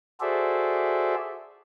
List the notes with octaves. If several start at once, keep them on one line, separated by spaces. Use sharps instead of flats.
F#4 G#4 A4 C5 D5 E5